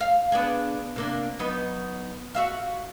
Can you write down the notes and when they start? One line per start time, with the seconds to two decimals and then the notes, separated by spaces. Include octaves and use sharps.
0.01 F5
0.32 B3 D4 G#4
0.96 C3 A#3 D4
1.39 F#3 B3 D#4
2.34 F#4 E5 F5